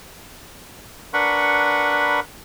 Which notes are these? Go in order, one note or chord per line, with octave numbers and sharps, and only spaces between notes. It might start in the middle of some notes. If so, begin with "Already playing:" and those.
D4 A#4 B4 F#5 B5 C#6